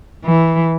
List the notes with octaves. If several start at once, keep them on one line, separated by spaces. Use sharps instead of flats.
E3